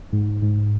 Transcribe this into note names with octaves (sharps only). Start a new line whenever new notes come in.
G#2
G#2